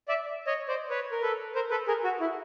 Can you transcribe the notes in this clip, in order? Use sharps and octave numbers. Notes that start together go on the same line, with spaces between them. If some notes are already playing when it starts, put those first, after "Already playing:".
D5 E5
C#5 D#5
C5 D5
B4 C#5
A#4
A4 B4
A#4 C5
A4 B4
G#4 A#4
F#4
E4